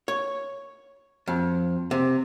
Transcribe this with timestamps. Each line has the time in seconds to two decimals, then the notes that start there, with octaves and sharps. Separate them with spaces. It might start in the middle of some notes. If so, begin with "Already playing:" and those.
0.08 C#5
1.28 F2
1.91 C3